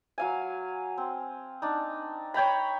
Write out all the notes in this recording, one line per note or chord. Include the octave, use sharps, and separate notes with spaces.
F#3 F5 G#5
C4
D4 D#4
C#5 G5 A#5 B5